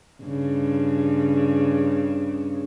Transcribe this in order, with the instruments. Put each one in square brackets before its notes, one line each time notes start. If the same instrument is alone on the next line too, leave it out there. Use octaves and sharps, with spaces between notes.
[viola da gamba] G2 C#3